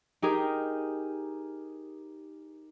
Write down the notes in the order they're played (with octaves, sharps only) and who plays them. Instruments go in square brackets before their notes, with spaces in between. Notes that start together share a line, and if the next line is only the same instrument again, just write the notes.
[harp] D#4 G4 G#4 A#4